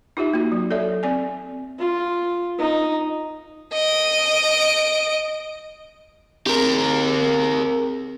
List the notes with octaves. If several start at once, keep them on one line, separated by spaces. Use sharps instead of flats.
D#4 F4 G4 E5
A#3 F#4
F#3
A4 C#5 D5 E5
C4 D5 G#5
F4
D#4
D#5 D7
C4 G4 G#4 A#4